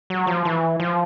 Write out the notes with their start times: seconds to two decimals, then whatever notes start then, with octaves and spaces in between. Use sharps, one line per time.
0.10 F#3
0.27 F3
0.45 E3
0.80 F3